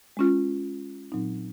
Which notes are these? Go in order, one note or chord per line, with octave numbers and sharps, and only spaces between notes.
G#3 C#4 F4
A#2 F#3 C4 D#4